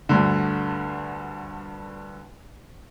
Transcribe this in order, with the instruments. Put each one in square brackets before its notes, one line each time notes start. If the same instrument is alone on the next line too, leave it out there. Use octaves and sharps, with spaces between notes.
[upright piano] D2 G2 D3